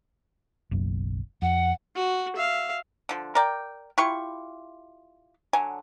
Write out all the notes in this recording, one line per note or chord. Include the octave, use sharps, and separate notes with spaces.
F#1 B1 F#2
F2 F#5
F#4
E5 F5
D3 F3
A#4 D5 G5
E4 F4 G4 C#6
D3 F#3 G#5